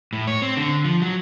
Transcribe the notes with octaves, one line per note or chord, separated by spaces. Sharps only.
A2
C#5
C4
D3
F3
F#3